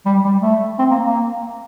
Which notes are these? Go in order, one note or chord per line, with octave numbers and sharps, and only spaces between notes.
G3
G3
A3
C4
A#3
A#3